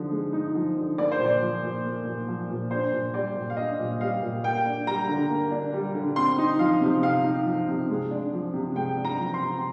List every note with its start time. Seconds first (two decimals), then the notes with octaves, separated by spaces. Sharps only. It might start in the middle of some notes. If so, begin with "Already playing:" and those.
Already playing: D3 F3 D#4
0.12 G#3
0.33 D#4
0.55 F3
0.77 D3
0.98 A#3 D5
1.12 C5
1.20 A#2
1.25 D5
1.42 F3
1.63 A#2
1.84 A#3
2.06 A#2
2.28 F3
2.50 A#2
2.71 D4 C5
2.92 A#2
3.14 G3 D5
3.36 A#2
3.50 F5
3.57 D4 D#5
3.79 A#2
4.00 G3 F5
4.22 A#2
4.44 A#3 G5
4.66 D4
4.87 G3 A#5
5.09 D3
5.30 A#3
5.51 D4
5.73 G3
5.94 D3
6.16 C4 C6
6.38 D#4
6.59 F3 F5
6.81 C3
7.03 C4 F5
7.24 D#4
7.46 F3
7.68 C3
7.90 G#3
8.11 D4
8.33 F3
8.54 C3
8.76 G#3 G5
8.97 D4
9.05 A#5
9.19 F3
9.34 C6
9.40 C3